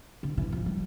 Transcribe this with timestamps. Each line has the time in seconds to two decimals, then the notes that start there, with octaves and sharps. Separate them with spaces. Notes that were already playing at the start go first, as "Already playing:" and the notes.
0.23 D3
0.37 E3
0.52 F3
0.66 G3